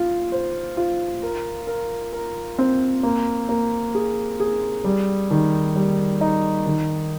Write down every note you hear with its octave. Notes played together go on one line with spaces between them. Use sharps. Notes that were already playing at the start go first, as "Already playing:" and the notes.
Already playing: F4
C5
F4
A#4
A#4
A#4
C4
A#3
A#3
G#4
G#4
G3
D#3
G3
D#4
D#3